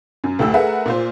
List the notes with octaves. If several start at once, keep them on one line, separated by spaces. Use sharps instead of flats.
F#2
D2 A2 G4 E6
A3 G#4 A#4 B4 E5 F#5
A#2 F4 C5